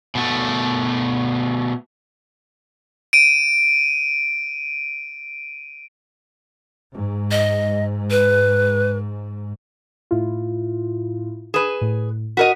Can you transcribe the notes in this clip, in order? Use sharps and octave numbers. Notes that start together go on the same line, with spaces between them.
B2 A3
D7 D#7
G#2
D#5
B4
A2 E4 F4
G#4 B4 E7
A2
F#4 A#4 D#5 B6